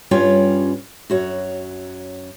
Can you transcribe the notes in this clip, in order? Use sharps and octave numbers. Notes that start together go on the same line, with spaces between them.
G2 G3 C#4 F4 C#5 G5
F#2 F#4 C#5